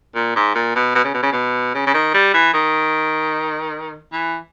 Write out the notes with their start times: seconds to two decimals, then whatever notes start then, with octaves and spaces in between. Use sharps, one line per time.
0.15 A#2
0.36 G#2
0.55 A#2
0.75 B2
0.95 B2
1.04 C#3
1.14 B2
1.23 C#3
1.32 B2
1.74 C#3
1.87 C#3
1.94 D#3
2.14 G3
2.34 E3
2.53 D#3
4.13 E3